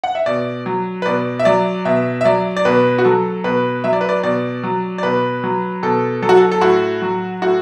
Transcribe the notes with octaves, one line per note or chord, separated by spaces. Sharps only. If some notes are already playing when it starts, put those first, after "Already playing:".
F#5
E5
B2 D5
F#3
B4
B2 D5
E5
F#3 D5
B2 E5
E5
F#3 D5
D5
B2 B4
F#4
F#3 A4
B2 B4
F#3 E5
D5
B4
D5
B2 D5
F#3
D5
B2 B4
F#3
B2 A4
F#3 A4
F#4
A4
A4
A2 F#4
F#3
A2 F#4